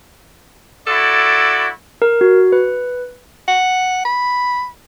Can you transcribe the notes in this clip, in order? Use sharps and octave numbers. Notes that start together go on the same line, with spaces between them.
E4 F#4 A4 D5
A#4
F#4
B4
F#5
B5